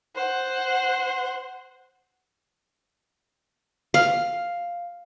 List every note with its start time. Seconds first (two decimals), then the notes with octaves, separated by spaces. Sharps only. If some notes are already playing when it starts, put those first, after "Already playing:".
0.15 C5 F#5
3.94 F5